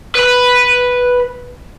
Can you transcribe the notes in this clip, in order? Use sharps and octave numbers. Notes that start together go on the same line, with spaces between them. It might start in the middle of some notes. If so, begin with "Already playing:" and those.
B4 B5